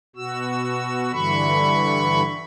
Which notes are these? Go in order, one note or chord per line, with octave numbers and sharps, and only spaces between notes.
B2 F#4 E6
G2 D3 E3 B5 C#6